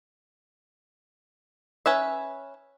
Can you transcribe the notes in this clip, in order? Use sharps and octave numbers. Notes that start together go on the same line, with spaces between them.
C#4 B4 E5